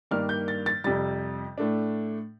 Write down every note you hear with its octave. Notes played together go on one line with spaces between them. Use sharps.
G2 D#3 A#3 D4 F6
G6
A6
A6
F2 C3 G3 A6
A2 A3 D4